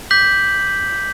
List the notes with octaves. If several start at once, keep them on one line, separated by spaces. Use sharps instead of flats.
D6 G6 B6 F#7